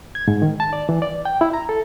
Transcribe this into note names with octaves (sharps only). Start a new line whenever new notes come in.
G#6
G#2
D#3
A5
D5
E3
D5
G5
E4
A#5
A4